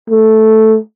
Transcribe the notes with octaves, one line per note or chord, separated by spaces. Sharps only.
A3